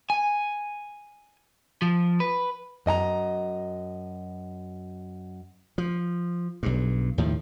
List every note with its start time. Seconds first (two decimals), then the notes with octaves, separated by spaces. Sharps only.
0.10 G#5
1.82 F3
2.20 B4
2.86 F#2 D#5 G#5 A#5
5.78 F3
6.63 B1 G2
7.18 D#2 A2 D#3 F3